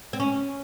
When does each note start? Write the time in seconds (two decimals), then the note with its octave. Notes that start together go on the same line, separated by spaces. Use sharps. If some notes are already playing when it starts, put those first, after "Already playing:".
0.13 C4
0.20 C#4